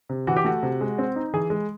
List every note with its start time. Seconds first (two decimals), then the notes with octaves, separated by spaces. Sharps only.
0.09 C3
0.27 E3 F#4
0.37 G4
0.45 A3 F#4
0.63 C3
0.81 G#3
0.98 C4
1.16 D#4
1.33 E3 G#4
1.50 G#3